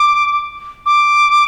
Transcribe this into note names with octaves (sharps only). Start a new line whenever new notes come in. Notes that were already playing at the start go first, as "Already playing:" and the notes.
Already playing: D6
D6